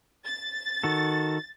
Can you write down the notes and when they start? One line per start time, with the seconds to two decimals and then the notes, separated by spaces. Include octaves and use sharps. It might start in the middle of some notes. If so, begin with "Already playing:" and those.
0.25 A6
0.83 D#3 F#4 A4